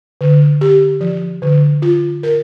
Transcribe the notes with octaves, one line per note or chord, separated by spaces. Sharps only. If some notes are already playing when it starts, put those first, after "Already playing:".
D3
G4
F3
D3
F4
A#4